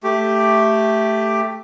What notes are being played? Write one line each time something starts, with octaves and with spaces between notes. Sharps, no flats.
A3 G4